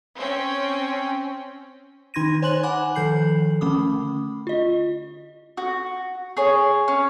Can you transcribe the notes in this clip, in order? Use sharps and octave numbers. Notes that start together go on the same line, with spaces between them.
C4 C#4 G5
D#3 D#4 C6 G#6 A#6 D#7
C5 C#5 G#5 C6 F#6 F#7
F#5 G#5 B5 D6 F#6
D#3 F3 A4 G6 C7 F#7
D3 A3 C#4 B5 D6 D#6
F4 D#5
F#4
G#4 C#5
C#4